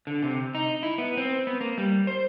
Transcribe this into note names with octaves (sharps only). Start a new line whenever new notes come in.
D3
C3
D#4
E4
B3
C4
B3
A#3
G3
C5